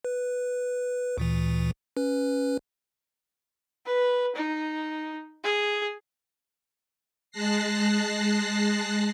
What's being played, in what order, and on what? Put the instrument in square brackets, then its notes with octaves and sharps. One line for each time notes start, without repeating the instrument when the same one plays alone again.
[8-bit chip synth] B4
D2 A#2 E3
C#4 B4
[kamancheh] B4
D#4
G#4
[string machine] G#3 A5 F#6 A#6 C7